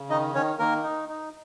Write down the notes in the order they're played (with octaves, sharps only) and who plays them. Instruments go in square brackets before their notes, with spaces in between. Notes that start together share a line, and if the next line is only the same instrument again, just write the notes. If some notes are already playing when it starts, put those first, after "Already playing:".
Already playing: [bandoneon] C#3
D#3 D#4 D#5
D#3 C#4 C#5
D#3 A#3 A#4
D#4
D#4